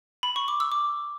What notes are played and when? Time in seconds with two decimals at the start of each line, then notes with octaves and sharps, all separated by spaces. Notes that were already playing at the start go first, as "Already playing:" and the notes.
0.23 B5
0.36 C#6
0.48 D6
0.60 E6
0.72 D6